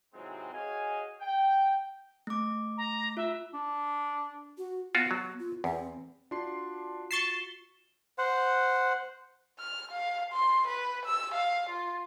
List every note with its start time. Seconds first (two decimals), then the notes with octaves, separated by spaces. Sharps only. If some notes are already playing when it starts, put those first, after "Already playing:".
0.14 G#2 C3 E3 F#3 G#3 C4
0.53 F#4 G#4 C#5 D#5 F5 G#5
1.21 G5
2.27 A3 D6
2.77 A#5
3.17 F4 E5
3.54 D4
4.58 F#4
4.95 B3 F4 F#4
5.11 F#3
5.39 F4
5.64 E2 C4
6.31 D4 F4 F#4 C6 C7
7.11 C#6 A6 B6 C7 E7 G7
8.18 C5 F#5
9.59 F6
9.92 F5
10.33 C6
10.68 B4
11.06 E6
11.34 F5
11.70 F4